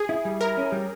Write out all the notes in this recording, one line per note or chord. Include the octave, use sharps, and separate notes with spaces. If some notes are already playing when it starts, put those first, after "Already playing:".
Already playing: G#4
E4
G3
E4 A#4
C#4
G3